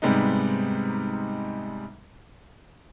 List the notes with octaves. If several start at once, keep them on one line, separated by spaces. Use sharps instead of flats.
G#2 C3 G3 G#3 B3 D#4